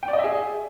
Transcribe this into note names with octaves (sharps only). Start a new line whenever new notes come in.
G5
D5
D#5
E5
G#4